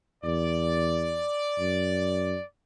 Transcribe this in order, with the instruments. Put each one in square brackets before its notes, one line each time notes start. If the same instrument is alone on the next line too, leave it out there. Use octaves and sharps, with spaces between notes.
[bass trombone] E2 [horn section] D5
[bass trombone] F#2